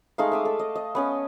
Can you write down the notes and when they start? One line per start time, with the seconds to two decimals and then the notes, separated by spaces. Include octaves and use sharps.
0.18 G#3 A3 D#4 F5
0.32 E5 D6 D#6
0.45 A4 F5
0.59 D#5
0.75 D#5
0.95 B3 C#4 B4